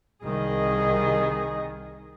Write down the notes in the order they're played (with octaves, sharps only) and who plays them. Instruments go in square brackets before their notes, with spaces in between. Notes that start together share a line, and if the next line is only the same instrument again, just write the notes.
[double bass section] C2 D#3 [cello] G#4 D#5